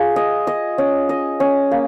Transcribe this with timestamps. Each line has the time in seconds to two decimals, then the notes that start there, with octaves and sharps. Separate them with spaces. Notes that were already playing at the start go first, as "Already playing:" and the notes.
Already playing: F4 G#4
0.16 D#5
0.47 D#5
0.78 C#4
1.09 D#5
1.40 C#4
1.71 A#3